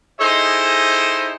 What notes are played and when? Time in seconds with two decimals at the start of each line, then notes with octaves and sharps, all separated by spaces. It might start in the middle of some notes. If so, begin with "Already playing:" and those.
0.21 D#4 E4 G#4 A4 C5 D#5